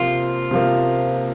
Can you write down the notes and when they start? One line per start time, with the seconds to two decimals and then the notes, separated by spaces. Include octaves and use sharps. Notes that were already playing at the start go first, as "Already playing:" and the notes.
Already playing: C3 F3 A#3 F4
0.51 C3 F3 A#3